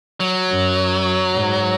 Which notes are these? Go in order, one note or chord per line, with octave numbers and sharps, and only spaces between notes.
F#3
F#2
G#2